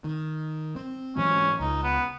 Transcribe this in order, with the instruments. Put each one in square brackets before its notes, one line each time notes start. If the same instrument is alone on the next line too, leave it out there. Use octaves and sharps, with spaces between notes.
[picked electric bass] D#3
C4
[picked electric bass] G#2 E3 F#3 [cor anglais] C#4
[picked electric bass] C#2 [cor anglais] D#4
[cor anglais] B3